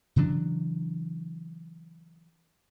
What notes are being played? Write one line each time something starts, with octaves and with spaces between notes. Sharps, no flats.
C#3 E3 F#3 D4